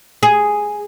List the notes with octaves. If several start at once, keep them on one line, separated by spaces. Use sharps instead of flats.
G#4